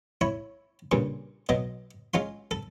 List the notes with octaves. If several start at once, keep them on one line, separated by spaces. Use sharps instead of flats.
E4 C#5
G2 A#2 C#3
B2 F#3 D#5
G#3 C#4 F4 C6
A4